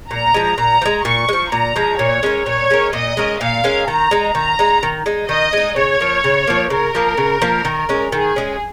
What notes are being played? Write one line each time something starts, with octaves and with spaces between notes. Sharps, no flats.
A#2 A#5
F3 G#3
A#2 A#5
F3
G#3
A#2 C#6
G#3
F3
A#2 A#5
F3 G#3
A#2 C#5
G#3 C#4 A#4
A#2 C#5
G#3 C#4 A#4
A#2 D#5
G#3 C#4 A#4
A#2 F5
G#3 C#4 A#4
D#3 A#5
G#3 D#4
D#3 A#5
G#3 D#4
D#3
G#3 D#4
D#3 D#5
G#3 D#4
C#3 C#5
F3 A#3
C#3
F3 A#3
C#3 A#4
F3 A#3
C#3
F3 A#3
D#3
G#3 C#4
D#3 G#4
G#3 C#4